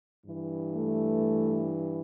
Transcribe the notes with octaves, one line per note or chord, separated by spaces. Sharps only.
G2 E3
A3